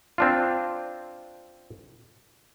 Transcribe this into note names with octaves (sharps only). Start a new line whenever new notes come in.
C4 D4 F4